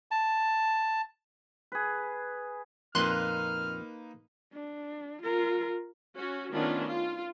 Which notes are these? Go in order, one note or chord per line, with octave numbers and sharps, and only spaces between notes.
A5
G#4 B4
F2 A#2 A#3 D#4 B4 C6 F6 F#6
D4
F4 A#4
C#4 F#4
D#3 A3 B3 C#4 D4 F4
F4